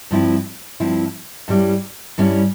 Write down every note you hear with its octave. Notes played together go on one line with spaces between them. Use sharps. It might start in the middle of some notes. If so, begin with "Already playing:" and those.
G2 F3 C4 E4
G2 F3 C4 E4
G2 G3 C#4 E4
G2 G3 C#4 E4